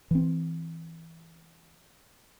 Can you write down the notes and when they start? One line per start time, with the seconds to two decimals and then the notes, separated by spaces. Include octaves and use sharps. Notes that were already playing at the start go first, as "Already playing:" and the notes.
0.11 E3 C4